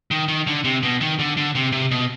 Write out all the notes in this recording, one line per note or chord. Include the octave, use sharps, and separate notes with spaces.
D#3
D#3
D3
C3
B2
D#3
D3
D3
C3
C3
B2